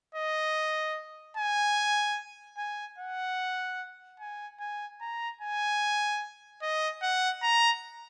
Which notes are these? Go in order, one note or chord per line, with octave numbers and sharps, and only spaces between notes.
D#5
G#5
G#5
F#5
G#5
G#5
A#5
G#5
D#5
F#5
A#5